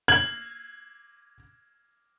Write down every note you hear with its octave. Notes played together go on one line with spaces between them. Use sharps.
G#6 F#7